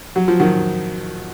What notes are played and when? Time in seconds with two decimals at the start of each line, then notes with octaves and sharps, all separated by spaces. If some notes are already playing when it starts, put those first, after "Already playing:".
0.16 F#3
0.28 F3
0.40 D#3 F#3